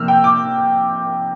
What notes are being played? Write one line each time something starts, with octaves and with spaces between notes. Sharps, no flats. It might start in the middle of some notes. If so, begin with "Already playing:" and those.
Already playing: C3 F3 A#3 E6 F6
G5
D6